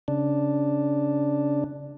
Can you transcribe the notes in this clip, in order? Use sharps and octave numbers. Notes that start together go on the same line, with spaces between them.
C#3 D4